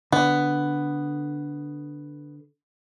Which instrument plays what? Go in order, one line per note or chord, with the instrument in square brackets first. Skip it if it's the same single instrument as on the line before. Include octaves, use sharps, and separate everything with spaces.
[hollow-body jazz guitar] D3 [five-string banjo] B3